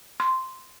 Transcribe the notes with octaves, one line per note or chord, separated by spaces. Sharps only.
C6